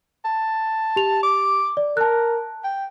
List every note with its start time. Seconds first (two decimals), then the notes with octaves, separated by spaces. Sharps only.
0.25 A5
0.96 G4 F7
1.23 D6
1.77 D5
1.97 A#4 A5 F#6
2.64 G5